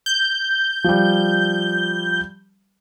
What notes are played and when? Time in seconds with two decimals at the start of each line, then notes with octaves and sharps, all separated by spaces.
0.06 G6
0.84 F3 G3